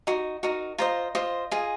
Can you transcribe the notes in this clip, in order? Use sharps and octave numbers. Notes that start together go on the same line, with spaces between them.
D#4 F#4
D#4 F#4 A#4
F4 C5 D#5 A#5
F4 C5 D#5
F4 G#4 D#5 G#5